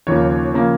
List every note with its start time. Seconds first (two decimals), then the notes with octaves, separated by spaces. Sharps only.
0.07 D#2 C#3 F3 A#3 C#5
0.54 C#3 F3 A#3